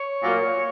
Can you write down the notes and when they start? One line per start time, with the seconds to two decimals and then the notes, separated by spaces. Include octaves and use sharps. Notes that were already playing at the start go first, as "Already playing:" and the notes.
Already playing: C#5
0.23 A#2 F#3 A#3